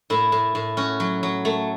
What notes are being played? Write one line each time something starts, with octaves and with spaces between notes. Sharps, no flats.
A2 E4
A2
A2
C#4 F#4
F#3
F#3
A3